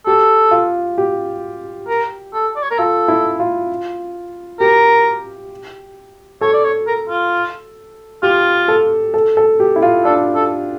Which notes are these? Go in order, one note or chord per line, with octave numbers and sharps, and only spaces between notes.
G4 A4
F4
G4
A#4
A4
D5
C#5
A#4
F4 A4
E4
F4
G4 A#4
A4 C#5
D5
C#5
A#4
F4
F4 G4
A4
A4
A4
G4
E4
F4
D4 A4
A4